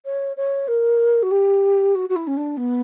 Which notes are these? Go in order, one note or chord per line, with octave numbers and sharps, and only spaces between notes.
C#5
C#5
A#4
F#4
G4
F#4
F#4
E4
C#4
D4
B3